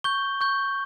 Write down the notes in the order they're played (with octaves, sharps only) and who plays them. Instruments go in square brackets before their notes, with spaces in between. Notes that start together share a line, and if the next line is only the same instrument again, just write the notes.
[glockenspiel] C#6 G6 G7
C#6 G6